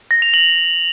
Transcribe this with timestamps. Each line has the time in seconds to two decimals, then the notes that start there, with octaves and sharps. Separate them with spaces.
0.11 A#6
0.22 F7
0.34 F#7